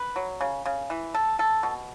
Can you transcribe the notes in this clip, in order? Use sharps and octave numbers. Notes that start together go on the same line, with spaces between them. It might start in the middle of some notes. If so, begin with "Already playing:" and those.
Already playing: B4
F#3
C#3
C#3
E3
A4
A4
B2